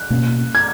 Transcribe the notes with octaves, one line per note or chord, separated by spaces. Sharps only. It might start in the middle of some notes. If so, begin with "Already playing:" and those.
Already playing: F#6
B2 A#3 C#4
G#6